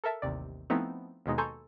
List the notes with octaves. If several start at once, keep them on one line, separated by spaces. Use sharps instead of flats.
A4 A#4 E5 A5
A1 D#2 C3 D5
F3 A3 B3 C4 D#4 E4
D#2 B2 G#3 D#4
A4 G#5 A#5 C6 C#6 G6